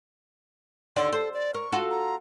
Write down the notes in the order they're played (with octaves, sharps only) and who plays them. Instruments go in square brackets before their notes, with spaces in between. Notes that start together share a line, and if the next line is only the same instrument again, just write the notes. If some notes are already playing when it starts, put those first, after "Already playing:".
[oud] D#2 D3 D5 [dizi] C6
[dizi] A4 [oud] C5
[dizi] D5
[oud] A#4 [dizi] C#6
[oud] F4 F#4 A4
[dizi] A#5